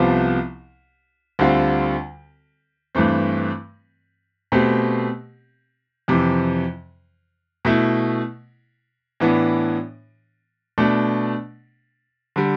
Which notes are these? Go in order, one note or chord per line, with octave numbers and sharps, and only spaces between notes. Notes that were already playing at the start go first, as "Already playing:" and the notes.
Already playing: C2 C3 F3 B3 F4
D2 D3 G3 C4 F4
G2 E3 A3 C4
B2 A3 C4 G4
F2 C3 E3
B2 A3 E4
A2 E3 B3 D4
B2 A3 D4
D3 G3